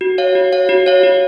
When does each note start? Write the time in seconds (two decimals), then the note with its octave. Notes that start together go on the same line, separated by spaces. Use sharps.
0.01 F#4
0.18 C#5 F5
0.35 F#4
0.53 C#5 F5
0.69 F#4
0.86 C#5 F5
1.03 F#4